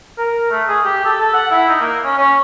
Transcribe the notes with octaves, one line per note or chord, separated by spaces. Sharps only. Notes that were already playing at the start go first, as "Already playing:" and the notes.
A#4
A3
G#4
G4
A4
A4
F#5
E4
D#4
A#3
C#4
C#4